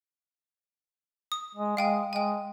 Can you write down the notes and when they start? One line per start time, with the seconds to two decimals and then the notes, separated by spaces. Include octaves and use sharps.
1.32 D#6
1.55 G#3
1.77 G#3 F5 G5 G#5
2.13 G#3 G5 G#5